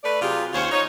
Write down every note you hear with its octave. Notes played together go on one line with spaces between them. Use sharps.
A3 B4 D5
C3 F#3 F4 G4 G#4
D#2 C#4 F4 C5 C#5 F5
D#4 C#5